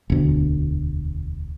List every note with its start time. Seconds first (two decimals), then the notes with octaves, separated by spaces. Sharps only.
0.10 E1 D2